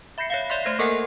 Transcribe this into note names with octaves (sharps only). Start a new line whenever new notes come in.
E5 B5 G6 A#6 C7 C#7
C#5 E5 F5
C#5 D5 E5 C6 F#6 B6
A3 C5 G#6 A#6 C7
A#3 A4 A#4 F#5 G#5